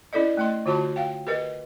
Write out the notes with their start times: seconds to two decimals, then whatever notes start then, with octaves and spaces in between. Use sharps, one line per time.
0.13 C#4 E4 A4 D5 D#5
0.37 A3 D#5 C6
0.66 D3 F4 F#4 A5 C6
0.96 F5 G5
1.27 G4 A#4 B4 D#5